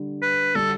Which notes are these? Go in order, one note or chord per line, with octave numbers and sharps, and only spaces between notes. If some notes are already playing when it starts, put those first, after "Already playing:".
Already playing: D3 G3 D4
B4
D3 G3 D4 A4